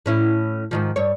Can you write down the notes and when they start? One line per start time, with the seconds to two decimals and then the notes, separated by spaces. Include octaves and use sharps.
0.06 A2 C#4 E4
0.71 G#2 D#3 F3
0.96 G2 C#5